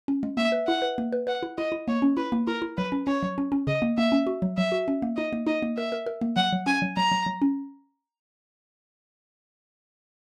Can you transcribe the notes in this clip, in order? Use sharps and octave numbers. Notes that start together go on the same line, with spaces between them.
C#4
G#3
A#3 E5
B4
E4 F#5
B4
A#3
B4
B4 F#5
E4
E4 D#5
E4
A#3 C#5
C#4
E4 B4
A#3
E4 A#4
E4
F#3 B4
C#4
C#4 C#5
F#3
C#4
C#4
C#3 D#5
A#3
A#3 E5
C#4
F#4
F#3
F#3 E5
F#4
C#4
A#3
D#4 D#5
A#3
D#4 D#5
A#3
A#4 E5
A#4
A#4
A#3
F#3 F#5
F#3
C#4 G#5
F#3
F#3 A#5
F#3
F#3
C#4